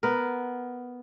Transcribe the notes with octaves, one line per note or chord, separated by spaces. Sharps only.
B3 A#4